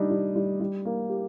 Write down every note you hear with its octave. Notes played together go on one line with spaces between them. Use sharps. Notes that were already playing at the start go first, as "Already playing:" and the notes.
Already playing: G3 D4 D#4
G3
G3
G3
A#3
G4